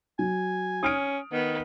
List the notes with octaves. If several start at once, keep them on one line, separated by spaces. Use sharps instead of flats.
F#3 G#5
C#4 D#6 F6 D7
D#3 B3